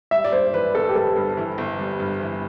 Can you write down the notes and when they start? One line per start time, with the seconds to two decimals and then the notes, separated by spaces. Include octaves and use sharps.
0.11 G3 E5
0.24 D5
0.32 G2 C5
0.53 E3 B4
0.75 G1 A4
0.89 G4
0.95 G3 A4
1.16 G2
1.37 E3
1.58 G1
1.79 G3
2.00 G2
2.21 E3